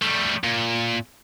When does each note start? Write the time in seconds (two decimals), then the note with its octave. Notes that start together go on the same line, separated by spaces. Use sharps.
0.02 G3 A3
0.44 A#2